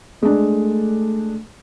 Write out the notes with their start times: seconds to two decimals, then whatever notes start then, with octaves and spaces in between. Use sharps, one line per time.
0.23 G#3 A3 D4